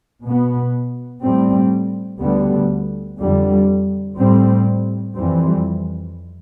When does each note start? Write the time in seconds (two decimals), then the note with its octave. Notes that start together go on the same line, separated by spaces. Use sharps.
0.24 B2 B3
1.23 A2 G3 C4
2.20 D2 D3 G3 B3
3.19 F2 D3 G3
4.17 A2 G3 C4
5.15 F2 E3 G3 C4